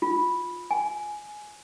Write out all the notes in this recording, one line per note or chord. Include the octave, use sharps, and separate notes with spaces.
F4
G#5